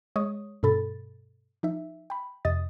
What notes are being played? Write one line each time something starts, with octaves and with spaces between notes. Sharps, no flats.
G#3 C#5 C#6 D#6
G2 B2 A4 B5 A6
F3 D#4 E5
G5 B5
F2 C3 D#5 D#6 A6